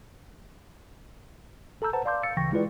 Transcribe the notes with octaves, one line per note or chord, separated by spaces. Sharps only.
G1 A4 A5 A#5 E6 G6
B4 C5 F#5 A5 A#5
D5 F5 A5 C6 D6 G6
F5 E6 A6 C#7
D2 C#3 E3 G5 C#6 A#6
G#3 E4 F4 G#4 B4 D5